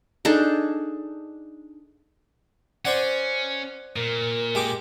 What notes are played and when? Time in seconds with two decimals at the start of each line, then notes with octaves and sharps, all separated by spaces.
0.25 D4 D#4 G#4 A4
2.85 C#4 C5 D5 F#5
3.96 A#2 A#4
4.55 G#3 G4 D6